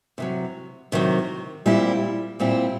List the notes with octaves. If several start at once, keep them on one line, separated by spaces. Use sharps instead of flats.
C3 D#3 F#3
C3 D#3 F#3
A#2 G3 C4 E4
A#2 G3 C4 E4